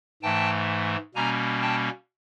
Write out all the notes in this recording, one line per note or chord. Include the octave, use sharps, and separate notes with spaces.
G#2 E3 A3 G5 A5
B2 G3 A#3 C#4 G#5 A#5
G5 A5